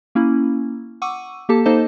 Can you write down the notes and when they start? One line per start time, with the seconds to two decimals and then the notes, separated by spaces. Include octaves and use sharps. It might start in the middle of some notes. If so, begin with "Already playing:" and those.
0.15 A#3 C#4 E4
1.02 F#5 C#6 D6 E6 D#7
1.49 A#3 G4 A4 A5
1.66 A#3 D#4 A4 C5 D#5 A5